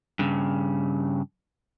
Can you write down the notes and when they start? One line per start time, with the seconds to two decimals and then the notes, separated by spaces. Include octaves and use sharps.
0.19 G2 C#3